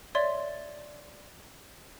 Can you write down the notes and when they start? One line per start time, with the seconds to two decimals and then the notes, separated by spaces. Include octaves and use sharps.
0.15 C#5 D5 E5 C6 A6